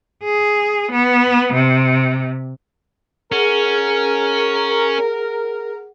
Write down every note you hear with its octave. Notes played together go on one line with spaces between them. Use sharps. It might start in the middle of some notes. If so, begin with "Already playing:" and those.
G#4
B3
C3
C#4 G#4 A#4 F#5